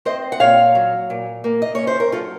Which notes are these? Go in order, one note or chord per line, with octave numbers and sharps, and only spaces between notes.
C4 C5 D#5
F#5
A#2 C#5 F5
F#3
A#2
A#3
D#5
C#4 C#5
C5
A#4
F#3 F4 A4